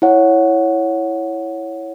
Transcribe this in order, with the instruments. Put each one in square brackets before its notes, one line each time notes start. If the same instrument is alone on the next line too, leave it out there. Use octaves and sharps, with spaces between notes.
[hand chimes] E4 C#5 F#5